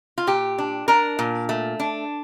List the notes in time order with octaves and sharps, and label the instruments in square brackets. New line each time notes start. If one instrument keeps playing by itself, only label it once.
[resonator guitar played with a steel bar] F4
A#2 G4
D4
D4 A#4
A#2
A3
D4